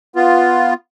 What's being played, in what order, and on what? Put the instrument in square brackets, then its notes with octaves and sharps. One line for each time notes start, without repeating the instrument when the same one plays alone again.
[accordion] B3 F4